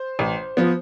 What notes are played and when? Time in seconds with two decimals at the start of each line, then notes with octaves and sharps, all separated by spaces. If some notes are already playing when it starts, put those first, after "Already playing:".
Already playing: C5
0.19 A1
0.57 F3 B3